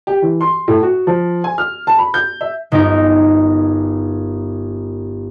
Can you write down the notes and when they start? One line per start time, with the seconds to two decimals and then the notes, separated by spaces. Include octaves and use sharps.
0.07 G4
0.22 E3
0.41 C6
0.68 A2
0.83 F#4
1.07 F3
1.44 G#5
1.58 F6
1.87 A5
1.99 B5
2.14 G6
2.41 E5
2.72 G1 D#4 A#4